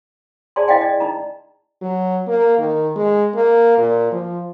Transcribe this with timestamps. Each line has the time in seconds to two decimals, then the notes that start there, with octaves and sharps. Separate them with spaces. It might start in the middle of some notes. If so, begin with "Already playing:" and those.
0.56 G#4 D5 G#5 A5 C6
0.68 E4 D#5 F5 G5 G#5
0.81 D5 D#5
1.00 D#4 A#5
1.82 F#3
2.27 A#3
2.58 D#3
2.96 G#3
3.35 A#3
3.78 A#2
4.12 F3